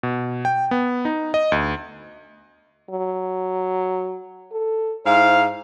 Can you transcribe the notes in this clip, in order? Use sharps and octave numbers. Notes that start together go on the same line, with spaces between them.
B2
G5
B3
D#4
D#5
D2
F#3
A4
G#2 E4 C5 F5